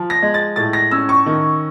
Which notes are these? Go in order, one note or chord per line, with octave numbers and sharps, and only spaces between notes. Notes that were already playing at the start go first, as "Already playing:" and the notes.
Already playing: F3
A#6
G#3
A6
A2 A6
A#6
C#4 E6
C#6
D#3